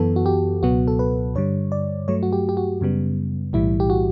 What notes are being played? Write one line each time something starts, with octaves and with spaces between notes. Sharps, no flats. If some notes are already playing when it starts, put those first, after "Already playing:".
Already playing: F#2 E3 B3 A4
F#4
G4
C#2 B2 F#3 B3 F#4
A4
B4
G2 D3 G3 C#5
D5
G2 F#3 A3 C#5
F#4
G4
G4
F#4
F#2 C#3 G3 B3
B1 A2 E3 G3 E4
G4
F#4